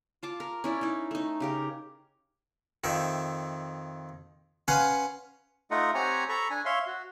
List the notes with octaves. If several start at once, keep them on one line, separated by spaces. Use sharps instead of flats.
F4 A5 D6
A#4
C#4 E4 D5
D#4 E4
A3 D#4
C#3 G4 A#4
F2 D#3 E5
C#4 B4 F5 F#5 G#5 C6
A3 D#4 F4 D#5 F#5
C4 G4 C#5 F#5 G#5 A#5
A4 A#5 B5 C#6
D4 G#5
C#5 E5 F5 C6
F#4